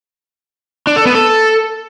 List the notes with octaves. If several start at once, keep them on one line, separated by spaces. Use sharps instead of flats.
D4
A4
B3
A4